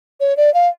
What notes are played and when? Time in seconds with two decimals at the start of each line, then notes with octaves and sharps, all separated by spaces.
0.20 C#5
0.37 D5
0.54 F5